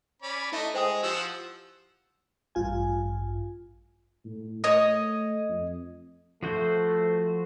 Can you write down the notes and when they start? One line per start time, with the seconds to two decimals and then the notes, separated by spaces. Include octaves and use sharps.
0.22 C#4 D5 B5
0.52 A3 E4 D#5 E5
0.74 G#3 G#4 C5 G5 D#6
1.03 F3 G4 F#5 E6
2.55 A1 G2 F4 G#5
4.25 A2
4.64 A3 C#5 D#5 D#6
5.49 F2
6.43 F3 A3 F#4 C5